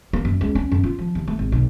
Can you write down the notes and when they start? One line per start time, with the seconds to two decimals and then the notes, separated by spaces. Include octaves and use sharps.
0.13 A#3
0.25 F#2
0.41 C#2
0.55 C#4
0.72 F#2
0.84 F4
0.99 F3
1.15 D#2
1.28 A3
1.39 G#1
1.52 B1